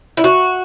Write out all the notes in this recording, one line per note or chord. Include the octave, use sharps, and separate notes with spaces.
E4
F#4